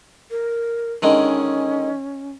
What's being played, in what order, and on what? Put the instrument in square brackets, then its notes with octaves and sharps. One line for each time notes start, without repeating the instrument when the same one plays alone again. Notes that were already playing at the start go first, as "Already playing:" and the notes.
[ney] A#4
[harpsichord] D3 D#3 G#3 [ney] C#4